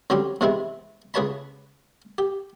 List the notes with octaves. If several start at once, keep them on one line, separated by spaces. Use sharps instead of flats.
D3 F#3 G3 C4 C#4 G4
G#2 C3 E3 G#3 C4 E4
C#2 G#4 B4 C#5 A5 B5
G4